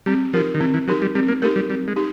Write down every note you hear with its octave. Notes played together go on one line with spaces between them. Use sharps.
G3 C4
F3 D#4 G4 A#4
D#3
E3 C4
E3
F#3 D#4 G4 A#4
G3
G3 C4
A#3
A3 D#4 G4 A#4
G3
G3 C4
G#3
D#4 G4